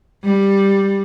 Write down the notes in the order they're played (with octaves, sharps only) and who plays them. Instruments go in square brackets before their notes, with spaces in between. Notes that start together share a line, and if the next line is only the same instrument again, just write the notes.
[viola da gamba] G3